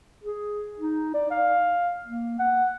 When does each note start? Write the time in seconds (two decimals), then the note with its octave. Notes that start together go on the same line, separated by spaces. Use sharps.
0.24 G#4
0.79 D#4
1.14 D5
1.31 F5
2.05 A#3
2.39 F#5